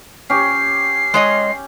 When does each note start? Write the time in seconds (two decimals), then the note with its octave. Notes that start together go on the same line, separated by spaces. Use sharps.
0.30 C#4 G4 C7
1.14 G#3 C#5 D#5